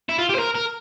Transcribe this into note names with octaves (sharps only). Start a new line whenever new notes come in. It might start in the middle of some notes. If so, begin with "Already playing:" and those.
E4
F4
G4
C5
A#4
A#4